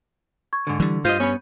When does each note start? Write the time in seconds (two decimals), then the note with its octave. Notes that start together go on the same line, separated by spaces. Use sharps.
0.53 C#6 G#6
0.67 G#2 D3
0.80 D3 E3 G3
1.05 G2 F4 C5 D#5 G6 D#7
1.20 B3 C#4 C#5 B5